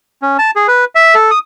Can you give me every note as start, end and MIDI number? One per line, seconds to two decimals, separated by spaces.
0.22 0.37 61
0.39 0.51 81
0.56 0.67 68
0.68 0.85 71
0.95 1.15 76
1.15 1.31 69
1.31 1.39 87